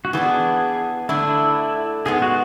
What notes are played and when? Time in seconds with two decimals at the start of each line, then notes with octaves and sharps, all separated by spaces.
0.05 F#4
0.13 E3 B3 D4 G#4
1.09 D3 A3 D4 E4
2.05 G#2 G#3 B3 G#4
2.22 F#4